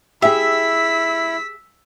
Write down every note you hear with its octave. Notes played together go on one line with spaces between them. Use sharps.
E4 G4 G#4 E5 E6 B6